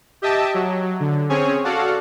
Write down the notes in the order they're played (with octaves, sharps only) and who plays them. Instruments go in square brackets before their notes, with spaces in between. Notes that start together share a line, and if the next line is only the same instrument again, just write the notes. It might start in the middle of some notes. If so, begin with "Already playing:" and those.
[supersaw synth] G4 D#5 E5 G5 A5
F#3
D3
C4 C#4 G#4 C#5 G#5
F#4 A4 D5 F5 F#5